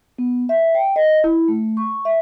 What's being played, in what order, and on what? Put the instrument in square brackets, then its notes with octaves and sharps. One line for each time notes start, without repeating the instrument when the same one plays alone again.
[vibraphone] B3
E5
G5
D#5
E4
A3
C#6
E5